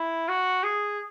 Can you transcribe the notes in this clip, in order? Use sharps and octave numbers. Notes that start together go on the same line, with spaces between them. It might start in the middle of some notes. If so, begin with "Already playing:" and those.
Already playing: E4
F#4
G#4